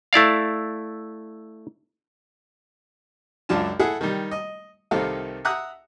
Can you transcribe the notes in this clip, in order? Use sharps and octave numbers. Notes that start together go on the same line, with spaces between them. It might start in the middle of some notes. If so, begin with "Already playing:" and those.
A3 E4 D5 F5
C#2 F#2 D4 F4 A5
E4 G#4 A4 F#5
D#3 G3
D#5
C2 C3 D#3 A4 A#4 F5
E5 F#5 A#5 D#6 F#6